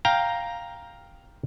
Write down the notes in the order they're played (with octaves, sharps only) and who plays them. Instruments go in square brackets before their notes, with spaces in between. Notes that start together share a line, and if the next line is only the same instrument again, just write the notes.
[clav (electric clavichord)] F5 G5 A#5